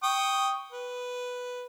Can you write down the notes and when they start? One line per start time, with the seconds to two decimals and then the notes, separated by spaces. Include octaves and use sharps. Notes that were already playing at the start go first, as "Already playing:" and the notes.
0.03 G5 C#6 D#6
0.72 B4